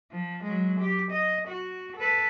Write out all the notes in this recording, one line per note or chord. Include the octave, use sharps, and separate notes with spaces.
F3
F#3 G#3
G4
D#5
F#4
A4 B4